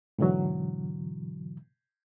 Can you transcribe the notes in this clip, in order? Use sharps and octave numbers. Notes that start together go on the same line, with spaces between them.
G#2 B2 D3 E3 F#3